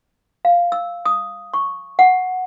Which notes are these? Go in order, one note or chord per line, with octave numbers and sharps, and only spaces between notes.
F5
E6
D#6
C#6
F#5